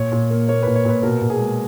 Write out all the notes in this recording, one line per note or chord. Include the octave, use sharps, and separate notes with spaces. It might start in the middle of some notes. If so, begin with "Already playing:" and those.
Already playing: A#2 C#5
A#2
A#3
A#3 C#5
A#2 B4
C#5
A#2 B4
B2 A#4
B2
G#4
G#3